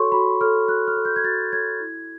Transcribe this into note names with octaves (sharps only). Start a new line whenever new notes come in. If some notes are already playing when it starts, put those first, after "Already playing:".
Already playing: F#4 A4 C#5 C6 C#6
F#4 B5
A4 C#5 F6
F#4 F#6
F6
A4 C#5
G6
G#6
F#4 A6
A4 C#5 G#6
E4